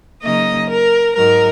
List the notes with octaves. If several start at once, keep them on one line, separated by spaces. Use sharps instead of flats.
C#3 F#3 A#3 D#4 D#5
A#4
G#2 F#3 D#4 A#4